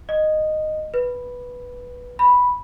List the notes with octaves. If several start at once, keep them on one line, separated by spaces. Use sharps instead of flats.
D#5
B4
B5